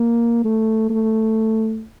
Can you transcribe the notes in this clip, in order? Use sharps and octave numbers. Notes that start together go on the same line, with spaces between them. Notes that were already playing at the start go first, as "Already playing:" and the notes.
Already playing: A#3
A3
A3